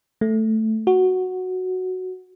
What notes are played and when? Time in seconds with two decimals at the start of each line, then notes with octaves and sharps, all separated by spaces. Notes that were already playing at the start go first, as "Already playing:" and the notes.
0.21 A3
0.87 F#4